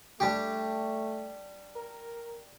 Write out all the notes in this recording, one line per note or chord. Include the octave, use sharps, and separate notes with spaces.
G3 A3 D4 G4
A#4